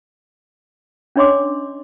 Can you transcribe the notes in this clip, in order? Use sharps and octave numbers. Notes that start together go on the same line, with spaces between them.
C#4 D4 C#5 D#5 C6 D6